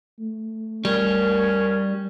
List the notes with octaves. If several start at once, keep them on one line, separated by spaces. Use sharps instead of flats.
A3
G3 C#4 A#4